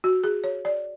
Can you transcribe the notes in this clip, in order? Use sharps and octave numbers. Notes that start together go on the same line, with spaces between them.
F#4
G#4
C#5
D5